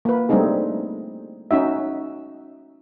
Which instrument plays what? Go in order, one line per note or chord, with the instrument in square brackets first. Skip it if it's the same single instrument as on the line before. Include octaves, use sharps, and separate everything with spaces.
[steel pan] A#3 B4
G3 A3 C4 D4 D#4 G#4
C#4 D#4 F#4 E5